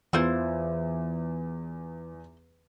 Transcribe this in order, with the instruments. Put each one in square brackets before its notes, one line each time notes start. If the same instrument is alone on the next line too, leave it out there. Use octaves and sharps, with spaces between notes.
[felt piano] E2 [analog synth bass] E3 [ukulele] E4 F4 C5